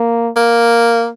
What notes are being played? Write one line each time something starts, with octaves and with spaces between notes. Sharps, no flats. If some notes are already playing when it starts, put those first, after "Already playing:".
Already playing: A#3
A#3